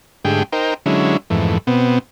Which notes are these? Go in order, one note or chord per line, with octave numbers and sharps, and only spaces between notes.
G#2 D3 A3 G4 G#4 G5
D#4 A#4 C5 G5
D3 F#3 G#3 C#4 E4
F2 G#2 E3 A3
B2 B3 C4